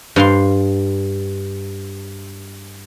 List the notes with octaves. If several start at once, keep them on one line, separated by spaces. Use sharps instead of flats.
G2 F5 C6